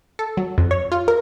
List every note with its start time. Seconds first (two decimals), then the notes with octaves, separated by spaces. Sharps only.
0.19 A4
0.37 F#3
0.58 F2
0.71 C#5
0.92 F4
1.08 A#4